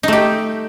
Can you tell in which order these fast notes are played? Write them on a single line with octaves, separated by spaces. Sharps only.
D#4 A3 G4